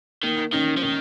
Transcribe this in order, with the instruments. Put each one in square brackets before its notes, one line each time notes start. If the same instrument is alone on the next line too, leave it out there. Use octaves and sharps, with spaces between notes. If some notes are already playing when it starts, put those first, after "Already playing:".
[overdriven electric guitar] D#3 [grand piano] A#3
[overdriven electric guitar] D#3 [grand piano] C#4
[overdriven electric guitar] F3
[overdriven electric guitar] D#3 [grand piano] C#4